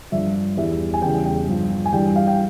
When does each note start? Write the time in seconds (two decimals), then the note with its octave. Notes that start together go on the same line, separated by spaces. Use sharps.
0.12 G2 F3 E5
0.57 E2 E3 G3 E5
0.94 G#5
1.02 E2 C#3 G3 G5
1.25 G5
1.48 G2 F3
1.86 G#5
1.93 G2 E3 G3 G5
2.16 F5
2.27 G5